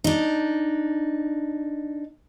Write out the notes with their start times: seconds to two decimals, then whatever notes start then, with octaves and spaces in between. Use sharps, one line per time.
0.04 D4 D#4